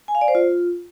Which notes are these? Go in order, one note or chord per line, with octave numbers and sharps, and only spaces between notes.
G#5
F5
D5
C5
F4